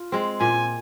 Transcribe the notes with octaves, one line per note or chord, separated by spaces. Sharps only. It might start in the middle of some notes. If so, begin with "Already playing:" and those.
Already playing: F4
G#3 C4
A#2 G#5